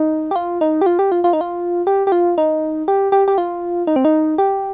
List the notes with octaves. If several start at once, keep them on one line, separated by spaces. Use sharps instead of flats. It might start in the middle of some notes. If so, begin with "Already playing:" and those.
Already playing: D#4
G4
F4
D#4
G4
F4
G4
F4
F4
D#4
F4
G4
G4
F4
D#4
G4
G4
G4
F4
D#4
C4
D#4
G4